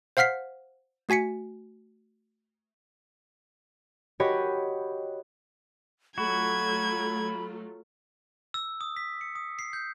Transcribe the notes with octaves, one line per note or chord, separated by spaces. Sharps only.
C5 F5 F#5 F6 B6 C7
A3 F#4 G#5 B6 C#7
F#4 G4 C#5 D#5 B5 D#6
F#3 A3 F4 F#4 B5 G#6
E6
D#6
B6
C#7
D#6
C7
G6